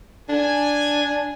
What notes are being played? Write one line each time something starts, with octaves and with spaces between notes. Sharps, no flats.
D4 G#5